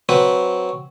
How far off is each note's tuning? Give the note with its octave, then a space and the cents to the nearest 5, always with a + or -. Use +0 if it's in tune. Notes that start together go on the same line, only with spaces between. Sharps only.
F#3 +0 C4 +0 B4 +0